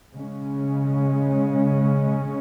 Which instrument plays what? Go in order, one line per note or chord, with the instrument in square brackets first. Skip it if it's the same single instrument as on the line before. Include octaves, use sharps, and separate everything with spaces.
[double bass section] C#3 G#3 C#4